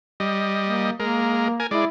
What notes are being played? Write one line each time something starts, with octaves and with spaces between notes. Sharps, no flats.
G3 D#5
A#3
G#3 A#3 A#4
A#4 G#5
G#3 E4 D5